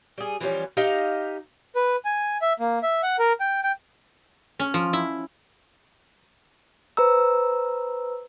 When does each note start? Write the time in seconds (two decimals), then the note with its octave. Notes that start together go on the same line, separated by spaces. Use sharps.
0.18 G3 G#4
0.41 E3 F3 G3 C#4
0.77 D#4 G4 D#5 F5
1.75 B4
2.05 G#5
2.42 E5
2.60 A#3
2.83 E5
3.03 F#5
3.19 A#4
3.40 G5
3.64 G5
4.59 C#4
4.74 F3
4.93 E4
6.97 B4 C5 A#5 E6